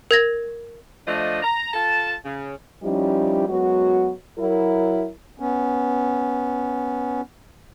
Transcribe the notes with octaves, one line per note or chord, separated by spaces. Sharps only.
A#4 G#6 A#6
F3 A3 D4 D#5
A#5
F4 A4 A5
C#3
F3 G3 C#4 D#4 E4 G4
F#2 F#3 G#3 B3 F#4
F#3 E4 A#4
B3 C#4